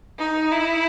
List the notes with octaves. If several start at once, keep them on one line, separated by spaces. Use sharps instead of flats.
D#4
E4